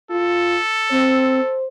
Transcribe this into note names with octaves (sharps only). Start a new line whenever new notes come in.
F4 A4
C4 C5